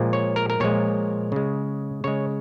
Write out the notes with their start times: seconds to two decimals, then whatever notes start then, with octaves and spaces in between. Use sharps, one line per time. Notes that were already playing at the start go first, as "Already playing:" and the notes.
Already playing: A#2 F3 G#3
0.13 C#5
0.36 A#4
0.50 A#4
0.60 A#2 F3 G#3 C#5
1.32 C#3 G#3
2.04 C#3 G#3 C#5